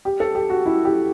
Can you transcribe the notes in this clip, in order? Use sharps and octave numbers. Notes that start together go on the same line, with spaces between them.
G4
A4
G4
F#4
E4
G4